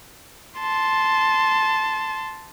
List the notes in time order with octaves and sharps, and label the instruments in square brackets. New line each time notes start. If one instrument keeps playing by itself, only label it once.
[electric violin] A5 C6